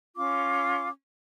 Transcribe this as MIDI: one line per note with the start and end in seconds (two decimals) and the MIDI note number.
0.16 0.89 61
0.16 0.89 65
0.16 0.89 86